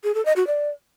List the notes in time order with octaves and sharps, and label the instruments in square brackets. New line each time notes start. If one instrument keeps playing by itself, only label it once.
[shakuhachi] G#4
A4
D#5
F#4
D5